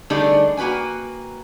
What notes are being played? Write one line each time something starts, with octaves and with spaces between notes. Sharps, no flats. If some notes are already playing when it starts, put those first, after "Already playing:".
D3 G3 A3 D4 D#4 G#4
A#3 F#4 B4 G5 G#5